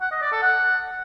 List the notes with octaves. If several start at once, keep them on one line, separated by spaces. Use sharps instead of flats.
F#5
D#5
D5
A4
F#5